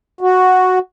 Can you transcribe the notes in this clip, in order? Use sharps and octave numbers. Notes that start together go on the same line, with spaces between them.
F#4